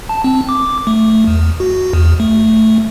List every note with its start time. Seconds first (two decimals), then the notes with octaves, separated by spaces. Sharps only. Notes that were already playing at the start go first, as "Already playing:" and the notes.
0.09 A5
0.24 C4
0.49 D6
0.87 A3
1.27 E2
1.60 F#4
1.93 E2
2.20 A3